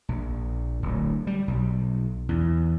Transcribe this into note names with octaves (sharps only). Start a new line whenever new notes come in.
A#1
D1
G3
B1
E2